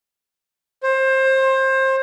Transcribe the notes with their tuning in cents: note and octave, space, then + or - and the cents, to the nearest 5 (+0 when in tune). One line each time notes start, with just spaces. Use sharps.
C5 +25